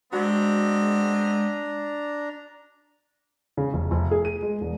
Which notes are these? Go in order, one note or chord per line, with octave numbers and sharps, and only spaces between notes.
G#3 B3 C4 D4 F#4 A#5
C#3
F1
F1
G#4
D#7
G#3
E1